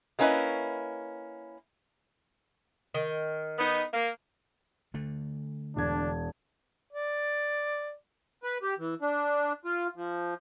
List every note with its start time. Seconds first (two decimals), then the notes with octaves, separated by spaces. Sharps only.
0.19 G#3 A#3 C#4 E4 B4 D#5
2.94 D#3
3.59 B3 D#4
3.93 A#3
4.94 D3 A3
5.76 E1 D4 G#6
6.93 D5
8.43 B4
8.63 G4
8.79 E3
9.02 D4
9.65 F4
9.96 F3